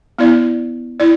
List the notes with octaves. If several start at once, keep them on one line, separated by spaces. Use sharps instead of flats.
B3 E4 D5
E4 D5